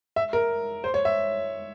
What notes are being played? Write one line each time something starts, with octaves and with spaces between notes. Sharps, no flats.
E5
A#4
C5
C#5
E5